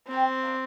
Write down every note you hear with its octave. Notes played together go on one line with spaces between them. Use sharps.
C4 F4 A#4 G5
D4 A#4 F5